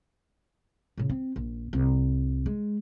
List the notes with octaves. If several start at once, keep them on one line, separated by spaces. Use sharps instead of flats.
A2 C#3
C4
A#1
C2
G#3